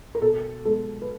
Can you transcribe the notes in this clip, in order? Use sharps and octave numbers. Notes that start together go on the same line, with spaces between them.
A#4
B2 A4
G#3 B3 A4
B4